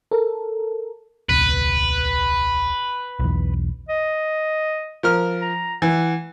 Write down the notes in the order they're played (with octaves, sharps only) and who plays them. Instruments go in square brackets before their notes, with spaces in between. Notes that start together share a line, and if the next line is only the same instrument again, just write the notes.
[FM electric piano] A4 A#4
[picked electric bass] D#1 C2 [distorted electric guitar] B4
[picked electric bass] B1 E2
[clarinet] D#5
[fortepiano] F3 A#4 F6
[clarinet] A#5
[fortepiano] E3 [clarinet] F#5